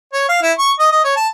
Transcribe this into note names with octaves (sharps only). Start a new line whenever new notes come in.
C#5
F5
E4
C#6
D#5
D#5
C#5
A5